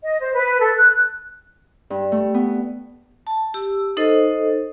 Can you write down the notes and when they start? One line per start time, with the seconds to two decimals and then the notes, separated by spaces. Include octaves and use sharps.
0.04 D#5
0.20 C5
0.34 B4
0.60 A4
0.77 F#6
1.90 G2
2.12 A3
2.34 B3
3.27 A5
3.54 G4 E6
3.97 D#4 A4 C5 D#5